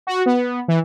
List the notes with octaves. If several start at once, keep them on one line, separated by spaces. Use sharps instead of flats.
F#4
B3
E3